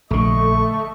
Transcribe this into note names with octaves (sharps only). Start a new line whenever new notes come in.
A#1 D3 A3 D#5 C#6